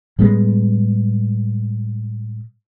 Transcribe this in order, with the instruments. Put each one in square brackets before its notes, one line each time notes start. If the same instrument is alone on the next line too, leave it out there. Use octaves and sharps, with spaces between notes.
[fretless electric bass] A2 G3 G#3 B3